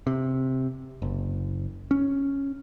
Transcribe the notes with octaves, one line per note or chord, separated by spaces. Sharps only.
C3
F#1
C#4